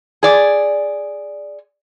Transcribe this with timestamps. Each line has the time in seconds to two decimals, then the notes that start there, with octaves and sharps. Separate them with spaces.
0.23 G#4 D5